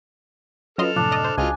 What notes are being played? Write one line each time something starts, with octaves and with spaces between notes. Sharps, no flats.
F#3 C#4 F4 A4 B4 D#5 C6 F6
F#2 A2 C3 F3 D4
D5 D#5
C5
C#2 F4 F#4 G#4 D#5 G#5